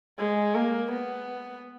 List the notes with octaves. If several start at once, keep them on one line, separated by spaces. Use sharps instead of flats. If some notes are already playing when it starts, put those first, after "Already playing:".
G#3
A#3
B3